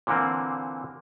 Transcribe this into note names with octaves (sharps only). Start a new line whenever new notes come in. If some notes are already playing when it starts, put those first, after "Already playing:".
A#2 D3 E3 A#3 C4